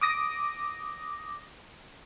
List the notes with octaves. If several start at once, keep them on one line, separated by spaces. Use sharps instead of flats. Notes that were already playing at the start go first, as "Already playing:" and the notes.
D6 D#6 A#6